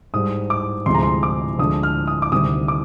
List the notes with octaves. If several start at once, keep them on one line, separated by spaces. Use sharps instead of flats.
G#2 G3 D#6
D6
D2 C3 F3 G#3 C6
A#5
C6
D6
D2 D3 F3 G#3 D#6
F6
D#6
D6
D2 C3 D#3 G3 D#6
D6